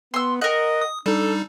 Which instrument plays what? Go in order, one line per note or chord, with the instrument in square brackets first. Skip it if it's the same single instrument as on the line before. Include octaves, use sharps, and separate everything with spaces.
[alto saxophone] B3 [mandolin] C6 E6
[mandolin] A#4 F#5 [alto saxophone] D#5
[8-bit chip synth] D#6
[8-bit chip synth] G3 D#4 [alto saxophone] D4 [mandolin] A4